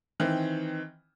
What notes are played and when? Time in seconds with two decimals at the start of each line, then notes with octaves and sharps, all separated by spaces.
0.20 D#3 E3 C4